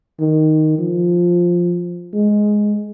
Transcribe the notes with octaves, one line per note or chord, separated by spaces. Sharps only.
D#3
F3
G#3